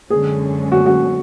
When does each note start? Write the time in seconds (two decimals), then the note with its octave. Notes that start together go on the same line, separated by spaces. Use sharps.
0.10 F#2 D3 G#3 C#4 G#4
0.72 F#4
0.86 F#4